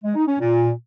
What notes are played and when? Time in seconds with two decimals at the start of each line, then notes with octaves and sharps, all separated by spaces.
0.04 G#3
0.16 D#4
0.27 C#4
0.39 A#2